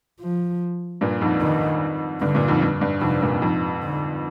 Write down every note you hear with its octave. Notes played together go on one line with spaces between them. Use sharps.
F3
G2 A#2
F2 G#2
D#3
G2 D3
G2 A#2
F2 G#2
G2
G2
F2 G#2 C3
G2 A#2
F2 G#2
D3